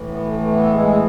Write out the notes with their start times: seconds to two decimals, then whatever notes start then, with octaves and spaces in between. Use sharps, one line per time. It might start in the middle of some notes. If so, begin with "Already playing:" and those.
Already playing: A2 E3
0.09 B3
0.27 A3
0.39 A3
0.50 B3
0.63 A4
0.74 G#3 G#4
0.86 G#4